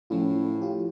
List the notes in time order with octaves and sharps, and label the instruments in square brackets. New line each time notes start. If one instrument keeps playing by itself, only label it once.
[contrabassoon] A2 [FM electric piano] F3 C#4 F4
[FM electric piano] F4 G4